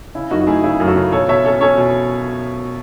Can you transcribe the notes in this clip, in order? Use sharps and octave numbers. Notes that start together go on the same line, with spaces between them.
C#3 E4
F#2 D#4 F#4
F#4
A3 E4 G#4
C#3 E4 G#4
F#2
F#4 A4
C#3
B2 A4 C#5
B2 C#5 E5
C#4 A4 C#5
C#4 A4 C#5
B2